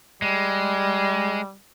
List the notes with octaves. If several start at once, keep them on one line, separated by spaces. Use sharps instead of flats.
G3 G#3